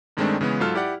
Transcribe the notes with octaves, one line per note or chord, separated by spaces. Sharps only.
G2 D#3 G#3 A3 C4 D4
C#3 E3 G#3 B3
G#2 F#3 F4 A4 A5 F6
E4 G4 D5 F#5